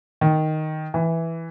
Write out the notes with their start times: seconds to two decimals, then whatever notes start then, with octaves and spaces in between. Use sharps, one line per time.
0.21 D#3
0.94 E3